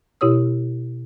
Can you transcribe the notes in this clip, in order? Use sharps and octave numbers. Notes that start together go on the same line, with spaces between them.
B2 E4 G4 C#5 D#6 E6